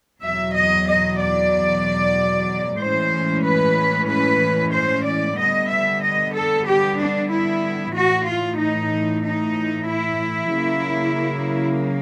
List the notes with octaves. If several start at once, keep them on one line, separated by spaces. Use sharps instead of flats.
E2 B2 F#3 E5
D#5
D#5
D5
A2 E3 G#3 C#4 C5
B4
B4
C5
D5
D3 G3 B3 D#5
E5
D#5
A4
G4
D4
E4
A2 E3 A3 F#4
F4
D#4
D#4
E4
C#3 F#3 A#3